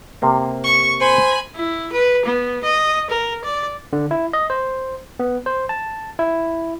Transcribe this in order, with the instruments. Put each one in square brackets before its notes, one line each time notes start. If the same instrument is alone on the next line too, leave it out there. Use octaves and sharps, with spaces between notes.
[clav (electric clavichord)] C3 A#3 C4
[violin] C#6
[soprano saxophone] C5 [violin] G#5 B5
[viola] E4
B4
B3
D#5
A#4
D5
[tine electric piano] D3
E4
D#5
C5
B3
C5
A5
E4